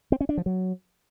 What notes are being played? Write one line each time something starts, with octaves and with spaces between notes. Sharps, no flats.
C4
C#4
D4
F3
F#3